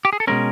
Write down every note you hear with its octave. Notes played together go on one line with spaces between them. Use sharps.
G4
G#4
A4
B2 G#3 C#4 A#4